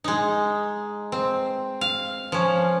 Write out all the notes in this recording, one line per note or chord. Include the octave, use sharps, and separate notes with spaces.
G#3 D#4
C4
F5
F3 C#4